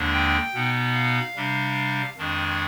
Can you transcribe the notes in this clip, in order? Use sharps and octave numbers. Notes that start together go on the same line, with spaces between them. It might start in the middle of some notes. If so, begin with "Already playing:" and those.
Already playing: D#2 D3 G#3 D4
G5
B2 B3 D#4
F5
C3 G3 D4
F2 D#3 G#3 D4